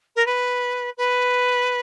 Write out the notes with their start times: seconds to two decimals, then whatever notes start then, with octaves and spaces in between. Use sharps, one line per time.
0.16 A#4
0.26 B4
0.97 B4